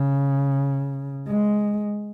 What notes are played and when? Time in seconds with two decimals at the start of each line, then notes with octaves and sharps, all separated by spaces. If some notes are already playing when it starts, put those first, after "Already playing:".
Already playing: C#3
1.28 G#3